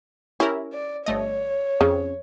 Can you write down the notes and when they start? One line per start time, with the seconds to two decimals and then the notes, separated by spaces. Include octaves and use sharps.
0.40 C#4 E4 G4 A#4
0.73 D5
1.06 G1 A3 C#5 D#5
1.81 F2 C#3